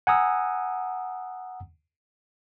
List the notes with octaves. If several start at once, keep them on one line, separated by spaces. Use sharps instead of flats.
F#5 G#5 A#5 D#6 E6